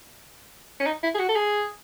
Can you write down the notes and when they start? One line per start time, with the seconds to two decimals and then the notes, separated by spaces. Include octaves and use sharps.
0.80 C#4
0.86 D#4
1.03 E4
1.14 G#4
1.19 F#4
1.29 A4
1.36 G#4